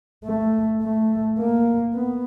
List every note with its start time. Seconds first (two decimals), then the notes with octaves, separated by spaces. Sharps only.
0.25 A3
0.82 A3
1.39 A#3
1.95 B3